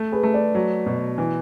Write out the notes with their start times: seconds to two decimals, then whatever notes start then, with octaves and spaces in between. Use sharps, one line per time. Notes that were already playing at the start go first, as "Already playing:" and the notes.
Already playing: A3
0.12 G#4 B4
0.23 A3
0.34 B4 D5
0.55 F#3
0.86 B2
1.18 E3